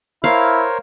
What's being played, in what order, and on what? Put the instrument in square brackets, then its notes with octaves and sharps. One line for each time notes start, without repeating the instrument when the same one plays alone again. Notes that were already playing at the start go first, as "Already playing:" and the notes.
[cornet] E4 [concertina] A#4 C5 C#5 [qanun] F5